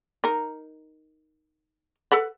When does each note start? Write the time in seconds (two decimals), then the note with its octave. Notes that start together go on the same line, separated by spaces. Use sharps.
0.24 D#4 A#4
2.12 A4 B4 F#5